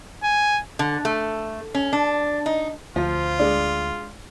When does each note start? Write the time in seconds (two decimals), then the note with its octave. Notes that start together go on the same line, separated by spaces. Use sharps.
0.23 G#5
0.79 D3
1.05 A3
1.75 C#4
1.93 D4
2.46 D#4
2.96 D2 F3 F4 C5
3.39 G#3 D4